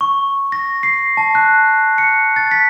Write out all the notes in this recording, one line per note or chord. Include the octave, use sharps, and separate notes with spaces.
C#6
A#6
C7
A5
F#6
C#7
A6
B6